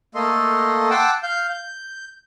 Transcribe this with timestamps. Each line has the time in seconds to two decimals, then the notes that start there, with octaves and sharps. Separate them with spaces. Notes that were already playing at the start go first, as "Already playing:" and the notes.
0.15 A3 A#3 A4 D#5 C6
0.90 F#5 G5 A5 C6 D6 E6
1.23 F5 G6
1.50 G6